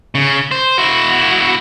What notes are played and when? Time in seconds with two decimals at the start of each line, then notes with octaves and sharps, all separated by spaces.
0.15 C#3
0.51 C5
0.78 E4 F#4